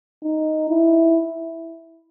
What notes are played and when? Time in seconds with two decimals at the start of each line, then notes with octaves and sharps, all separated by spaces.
0.24 D#4
0.70 E4